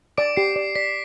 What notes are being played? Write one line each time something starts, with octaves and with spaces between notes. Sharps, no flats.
D5 D6 D7
G4 C7
D5
D5 B6